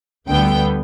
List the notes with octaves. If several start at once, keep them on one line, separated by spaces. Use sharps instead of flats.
D2 D3 G3 B3 G5